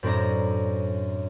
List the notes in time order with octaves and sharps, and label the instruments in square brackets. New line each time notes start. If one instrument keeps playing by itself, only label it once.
[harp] F#2 A2 C4 D4 A#5